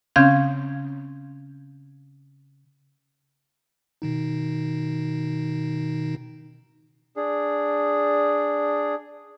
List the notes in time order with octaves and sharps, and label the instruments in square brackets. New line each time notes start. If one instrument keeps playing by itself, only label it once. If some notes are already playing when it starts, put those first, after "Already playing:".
[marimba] C#3 C4 C#4 F5 G6 G#6
[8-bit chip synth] B2 D#3 D#4
[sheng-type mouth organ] D4 G#4